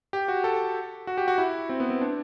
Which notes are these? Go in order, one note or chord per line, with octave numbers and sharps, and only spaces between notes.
G4
F#4
A4
F#4
G4
F#4
E4
C4
B3
C4
D4